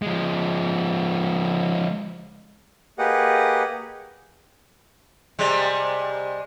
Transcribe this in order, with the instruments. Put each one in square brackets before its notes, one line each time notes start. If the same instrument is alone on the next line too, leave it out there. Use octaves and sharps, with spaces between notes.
[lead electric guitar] F3 G#3
[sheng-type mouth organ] A#3 G4 G#4 B4 D#5 F#5
[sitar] C3 G3 G#3